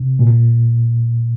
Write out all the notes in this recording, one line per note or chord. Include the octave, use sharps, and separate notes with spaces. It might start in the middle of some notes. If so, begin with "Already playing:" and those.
Already playing: C3
A#2